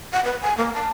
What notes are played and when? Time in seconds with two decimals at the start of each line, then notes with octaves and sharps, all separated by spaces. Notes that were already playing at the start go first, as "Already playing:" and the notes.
0.13 F#5
0.25 B4
0.42 G#5
0.57 A#3
0.74 A5